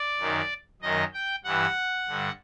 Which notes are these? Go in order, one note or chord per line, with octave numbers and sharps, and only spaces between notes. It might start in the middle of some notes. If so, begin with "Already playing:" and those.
Already playing: D5
F#2 D#3
F#2 D#3 D#5
G5
G2 E3 F#5
G2 D3